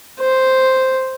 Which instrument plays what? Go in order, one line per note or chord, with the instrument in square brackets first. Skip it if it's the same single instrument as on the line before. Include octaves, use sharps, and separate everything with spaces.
[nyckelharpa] C5